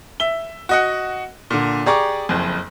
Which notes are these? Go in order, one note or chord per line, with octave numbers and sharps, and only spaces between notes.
E5 G7
F#4 D#5 F#5
A#2 D3
G4 G#4 D5 A#5 C#6 D6
F#1 F2